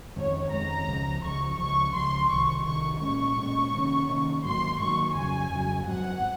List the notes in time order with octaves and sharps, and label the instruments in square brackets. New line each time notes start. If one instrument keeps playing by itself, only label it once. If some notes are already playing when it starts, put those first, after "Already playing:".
[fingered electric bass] F2 D#3 G#3 C4 [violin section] C#5
[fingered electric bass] F2 D#3 G#3 C4 [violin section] A#5
[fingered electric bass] C#2 C#3 F3
[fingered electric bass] C#2 C#3 F3 [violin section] C#6
[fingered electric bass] C#2 C#3 F3 [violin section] C#6
[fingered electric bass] C#2 C#3 F3 [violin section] C6
[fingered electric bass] C2 C3 D#3 [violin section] C#6
[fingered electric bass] C2 C3 D#3 [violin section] C#6
[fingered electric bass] A#2 G#3 C#4 [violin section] C#6
[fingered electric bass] A#2 G#3 C#4
C3 D#3 A#3 C#4
C3 D#3 A#3 C#4
[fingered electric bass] G#2 D#3 F#3 A#3 [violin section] C6
[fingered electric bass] G#2 D#3 F#3 A#3 [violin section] C#6
[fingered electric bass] F2 C#3 F#3 [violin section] G#5
[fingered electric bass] F2 C#3 F#3
[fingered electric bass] G#2 F#3 C4 [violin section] F#5